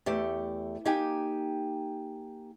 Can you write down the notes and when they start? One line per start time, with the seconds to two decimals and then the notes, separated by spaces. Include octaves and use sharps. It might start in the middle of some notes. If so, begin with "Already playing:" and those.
0.06 E2 A3 G4
0.85 A#3 D#4 G4 G5 G#5